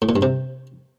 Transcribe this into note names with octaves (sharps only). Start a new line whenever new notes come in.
A2
A#2
G2
C3